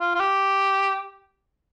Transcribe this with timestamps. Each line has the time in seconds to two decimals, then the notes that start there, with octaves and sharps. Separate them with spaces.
0.01 F4
0.15 F4
0.20 G4